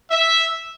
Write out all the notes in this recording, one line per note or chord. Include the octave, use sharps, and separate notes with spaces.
E5